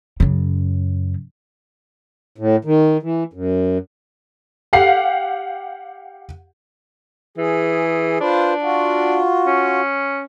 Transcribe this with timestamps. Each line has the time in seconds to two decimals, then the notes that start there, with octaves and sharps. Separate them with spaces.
0.20 F#2 C#3
2.38 A2
2.65 D#3
3.03 E3
3.33 F#2
4.73 G4 F5 F#5 C7
7.37 E3 G#4
8.20 D4 F4 B4 C5
8.62 F4 F#4
9.47 C#4